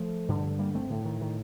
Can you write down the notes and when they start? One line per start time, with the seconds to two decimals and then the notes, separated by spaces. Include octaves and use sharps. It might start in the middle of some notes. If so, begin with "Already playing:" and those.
Already playing: F3 A3
0.28 G2 D3
0.59 G3 A#3
0.74 A3 C4
0.90 A2 D3
1.05 D#3
1.21 D#3